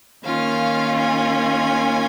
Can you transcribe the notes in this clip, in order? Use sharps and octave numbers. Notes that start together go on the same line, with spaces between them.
D#3 A#3 C#4 F4 F5
G#5